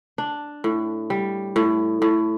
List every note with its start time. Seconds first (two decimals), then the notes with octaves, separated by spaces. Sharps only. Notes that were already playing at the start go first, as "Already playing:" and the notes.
0.18 D4
0.64 A2
1.10 G3
1.56 A2
2.02 A2